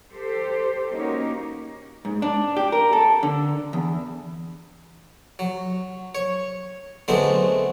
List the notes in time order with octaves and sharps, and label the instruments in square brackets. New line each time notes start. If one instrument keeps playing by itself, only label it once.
[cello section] G4 A4 C5
A#3 C#4 D#4 F#4 G4 A#4
[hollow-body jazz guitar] G#2
D4
G4
A#4
A4
D3
E2
[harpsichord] F#3
C#5
D3 F#3 G#3 A3 B3 C4